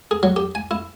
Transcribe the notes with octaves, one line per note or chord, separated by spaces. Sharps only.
G#4
F#3
G4
G#5
E4